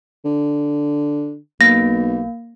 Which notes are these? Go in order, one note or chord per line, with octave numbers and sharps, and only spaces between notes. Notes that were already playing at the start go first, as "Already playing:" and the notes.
D3
B1 A#3 A#6